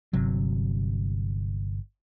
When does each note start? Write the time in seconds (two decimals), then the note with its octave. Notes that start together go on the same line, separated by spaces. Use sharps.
0.13 G1 C3 F#3